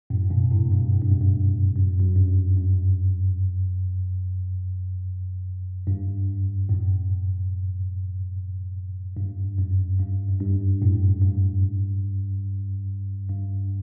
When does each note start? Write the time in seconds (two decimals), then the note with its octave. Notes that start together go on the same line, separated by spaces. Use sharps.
0.10 F#2 A2
0.30 G2 B2
0.51 A2 C3
0.72 G2 B2
0.93 A2
1.02 G2
1.11 F#2
1.21 G2
1.76 F#2
1.99 F#2
2.16 G2
2.57 F#2
5.87 G2
6.69 F#2 A2
9.17 G2
9.58 F#2
9.99 G2
10.29 F#2
10.40 G2
10.82 F#2 A2
11.22 G2
13.29 G2